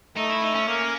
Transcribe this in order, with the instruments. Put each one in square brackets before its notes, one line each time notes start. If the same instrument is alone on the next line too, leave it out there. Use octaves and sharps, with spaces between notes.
[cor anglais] A3 [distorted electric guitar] D#4
[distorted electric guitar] E4
D#4
C#4
[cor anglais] A#3